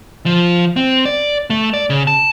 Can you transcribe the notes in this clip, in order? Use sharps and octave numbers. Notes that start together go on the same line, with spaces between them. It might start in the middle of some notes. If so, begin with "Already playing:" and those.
F3
C4
D5
A3
D5
C#3
A5